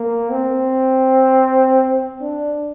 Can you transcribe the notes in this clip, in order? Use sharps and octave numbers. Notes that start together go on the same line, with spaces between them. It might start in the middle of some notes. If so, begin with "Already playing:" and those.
Already playing: A#3
C4
D4